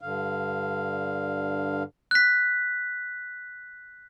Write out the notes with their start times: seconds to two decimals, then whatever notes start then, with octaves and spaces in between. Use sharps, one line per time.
0.01 G2 D3 F5
2.11 F#6 B6